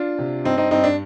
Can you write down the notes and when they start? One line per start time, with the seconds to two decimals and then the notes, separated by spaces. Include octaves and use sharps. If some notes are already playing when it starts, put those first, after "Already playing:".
Already playing: D4 F4
0.18 C3
0.44 G2 C4 D#4
0.57 C4 D#4
0.71 G2 C4 D#4
0.84 D4